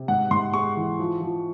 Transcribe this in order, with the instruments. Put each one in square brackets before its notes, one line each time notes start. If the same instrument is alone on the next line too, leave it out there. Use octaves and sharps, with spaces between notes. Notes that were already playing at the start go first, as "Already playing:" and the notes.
Already playing: [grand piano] C3
G#2 F#5
G#2 C6
G#3 C#6
E3
F3
F3